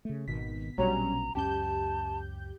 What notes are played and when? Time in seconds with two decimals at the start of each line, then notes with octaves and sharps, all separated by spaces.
0.05 C#3 A3
0.28 G#1 B2 D#3 B6
0.78 A#1 B2 F#3 G3 C#4 D4 A#5
1.35 C#2 F#2 C#4 G4 A5 G6